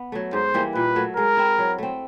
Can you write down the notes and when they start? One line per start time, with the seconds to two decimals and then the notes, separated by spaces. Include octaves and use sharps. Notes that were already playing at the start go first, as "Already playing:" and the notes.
Already playing: B3
0.12 F#3 A3
0.33 G#2 C5
0.54 E3 G3 A#3
0.75 A#2 B4
0.96 F#3 A3
1.16 G#3 A#4
1.37 C4 E4
1.59 F#3
1.78 A3 C4